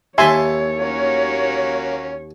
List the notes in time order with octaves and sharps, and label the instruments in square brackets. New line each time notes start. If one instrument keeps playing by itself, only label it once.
[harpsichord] D#2 A4 [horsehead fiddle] C#5 [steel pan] E5 G#5 C6
[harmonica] A#3 C#4 F#4